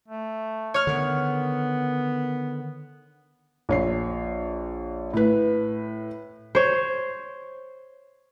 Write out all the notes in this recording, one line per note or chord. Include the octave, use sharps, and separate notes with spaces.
A3
C#5 F6
D3 D#3 B3
A#1 C#5 C7
A2 B4
C5 C#5